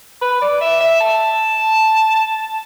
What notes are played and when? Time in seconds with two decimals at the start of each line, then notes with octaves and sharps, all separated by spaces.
0.22 B4
0.42 D5
0.61 E5
0.81 E5
1.00 A5